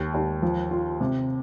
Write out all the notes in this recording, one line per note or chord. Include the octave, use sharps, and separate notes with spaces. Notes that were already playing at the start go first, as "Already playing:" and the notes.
Already playing: D#2
D#2
F3
F4
C3